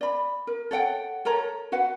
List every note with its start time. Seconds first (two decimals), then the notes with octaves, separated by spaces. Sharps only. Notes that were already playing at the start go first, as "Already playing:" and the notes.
0.01 D5 B5
0.47 A#4
0.71 A4 C#5 F#5 G5
1.25 A4 A#4 C#5 A#5
1.72 F#4 B4 F#5